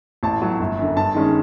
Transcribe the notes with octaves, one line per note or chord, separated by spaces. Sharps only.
A1 A5
A2 F#3
G1
F#2 D3
G2 A5
D#3 G#3 C#4